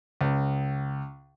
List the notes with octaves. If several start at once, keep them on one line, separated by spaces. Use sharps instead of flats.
C#2